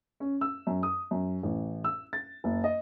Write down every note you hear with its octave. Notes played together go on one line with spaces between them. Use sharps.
C#4
E6
F#2
D#6
F#2
A1
E6
A6
F#1
D#5